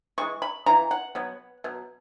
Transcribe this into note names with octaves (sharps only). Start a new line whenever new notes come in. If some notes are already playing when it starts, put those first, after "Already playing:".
C#3 E3 G#3 C#6
B5
C#3 E3 A#5
F#5
B2 F#3 B3
B2 F#3